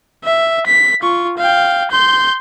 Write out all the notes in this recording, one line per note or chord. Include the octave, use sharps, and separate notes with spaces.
E5
B6
F4 C#6
F5 G5
C6 G6